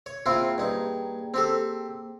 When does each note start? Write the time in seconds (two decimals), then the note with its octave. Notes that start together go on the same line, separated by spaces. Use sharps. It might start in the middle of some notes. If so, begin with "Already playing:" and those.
0.06 C#5
0.26 A#3 C4 E4 F4 G#4 G5
0.58 G2 D#4
1.34 C4 G4 A4